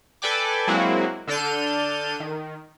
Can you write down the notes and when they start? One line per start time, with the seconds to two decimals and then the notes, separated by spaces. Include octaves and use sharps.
0.22 A4 B4 D5 G5 G#5 D6
0.67 F#3 G#3 A#3 C4 E4 F#4
1.27 D3 D4 A4 F6 G6 D#7
2.20 D#3